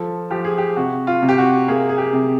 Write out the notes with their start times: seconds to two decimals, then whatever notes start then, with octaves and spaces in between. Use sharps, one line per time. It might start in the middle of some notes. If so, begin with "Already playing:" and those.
Already playing: F3 A4
0.30 F3 G4
0.45 G#4
0.58 G4
0.76 C3 F#4
1.07 F4
1.22 C3
1.29 G4
1.38 F#4
1.68 A#3 G#4
1.89 G#4
1.98 G4
2.13 C3